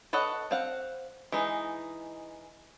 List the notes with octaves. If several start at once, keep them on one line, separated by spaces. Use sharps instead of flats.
A4 B4 C#5 D#5 F#5
C4 F5 F#5
E3 G#3 D#4